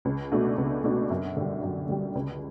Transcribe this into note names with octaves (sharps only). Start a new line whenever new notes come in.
C#2
B2 A3 D4 F#4
C#2
B2 A3 D4 F#4
F#2
D3 G3
F#2
D3 G3
C#2